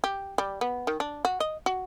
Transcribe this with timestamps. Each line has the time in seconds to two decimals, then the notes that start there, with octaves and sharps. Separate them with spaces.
0.04 G4
0.38 G3
0.61 B3
0.87 D#3
1.00 D4
1.25 F#4
1.40 D#5
1.66 F#4